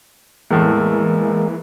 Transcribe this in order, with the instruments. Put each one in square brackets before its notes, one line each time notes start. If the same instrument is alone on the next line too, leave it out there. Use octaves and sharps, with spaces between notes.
[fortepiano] E2 A2 [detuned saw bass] E3 [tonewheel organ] G#3 A#3